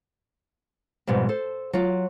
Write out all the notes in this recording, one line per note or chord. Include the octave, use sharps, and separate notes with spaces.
F2 G#2 B2 G3
A4 C5
F#3 F4